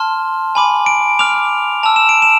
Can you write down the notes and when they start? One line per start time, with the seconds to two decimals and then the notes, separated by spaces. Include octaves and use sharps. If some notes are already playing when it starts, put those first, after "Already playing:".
Already playing: A5 C6 F6
0.55 G#5 B5 D6
0.86 D7
1.19 B5 D6 F6 F7
1.83 A5 E6 F7
1.96 E7
2.09 D7
2.22 E7